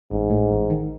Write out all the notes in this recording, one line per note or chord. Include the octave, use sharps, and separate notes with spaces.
A1 G#2
A2
A1
D#3